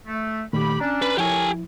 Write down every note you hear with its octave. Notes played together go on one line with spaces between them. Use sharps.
A3
A#2 D#3 A3 G4 B5
C#4 D4 D5 A#5
B4
F3 E4 G4 A4 A#4 C#5 G#5